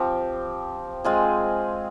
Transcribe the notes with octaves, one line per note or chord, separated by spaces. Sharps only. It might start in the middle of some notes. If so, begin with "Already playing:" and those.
Already playing: F3 C4 G4
G#3 C4 F4 G#4